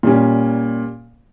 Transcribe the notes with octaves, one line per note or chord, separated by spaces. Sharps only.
A#2 G3 C#4